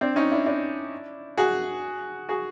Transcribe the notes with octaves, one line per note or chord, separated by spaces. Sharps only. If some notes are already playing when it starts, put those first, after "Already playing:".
C4 D4
C#4 D#4
D4 E4
D4 E4
F#4 G#4
F#4 G#4